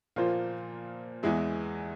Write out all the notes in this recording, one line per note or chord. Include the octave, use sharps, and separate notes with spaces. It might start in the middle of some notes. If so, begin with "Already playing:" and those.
A#2 F3 A#3 F4 C5
E2 E3 G#3 E4